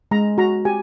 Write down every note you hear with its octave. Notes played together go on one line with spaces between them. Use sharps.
G#3 A#5
F#4 A#5
G4 G#5